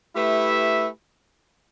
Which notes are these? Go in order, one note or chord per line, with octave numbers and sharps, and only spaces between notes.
A3 E4 G4 B4 E5